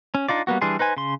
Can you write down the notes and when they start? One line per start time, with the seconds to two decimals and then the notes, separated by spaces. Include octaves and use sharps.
0.15 C#4
0.29 D4 D#4 F4 D5
0.47 G3 A#3 B3 F#4
0.61 E3 G3 D4 G#4 C6
0.79 D#4 B4 C5 G#5
0.96 C#3 C6